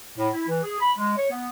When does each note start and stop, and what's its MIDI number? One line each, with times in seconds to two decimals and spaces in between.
0.18 0.28 45
0.34 0.44 64
0.48 0.60 52
0.63 0.76 68
0.80 0.91 83
0.97 1.14 56
1.17 1.26 73
1.31 1.48 59